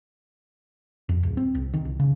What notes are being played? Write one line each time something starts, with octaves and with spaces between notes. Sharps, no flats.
F2
D1
C4
C2
D#3
C2
C#3